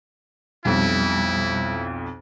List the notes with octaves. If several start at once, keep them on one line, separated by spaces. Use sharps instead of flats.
B1 F2 B2 G3 E4